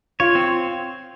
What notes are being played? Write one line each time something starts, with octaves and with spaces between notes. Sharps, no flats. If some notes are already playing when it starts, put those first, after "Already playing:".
F4 C#5
C4